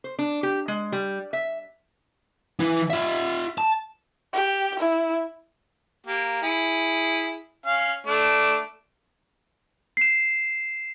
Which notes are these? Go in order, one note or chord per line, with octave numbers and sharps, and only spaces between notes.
C5
D4
G4
G#3
G3
E5
E3 E4
F4 E5
A5
G4
E4
A#3 G4
E4 G#4
C#4 F5
A3 D4
C7 E7